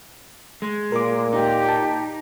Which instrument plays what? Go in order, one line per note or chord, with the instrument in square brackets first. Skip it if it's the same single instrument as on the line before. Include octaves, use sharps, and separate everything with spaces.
[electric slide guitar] G#3
[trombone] A#2 [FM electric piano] A#4 D6
[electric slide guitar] D#4 [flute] G4
[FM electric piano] A5